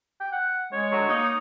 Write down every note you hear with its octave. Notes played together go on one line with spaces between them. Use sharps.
G5
F#5
G#3 C#5
D3 F#3
A#3 D#4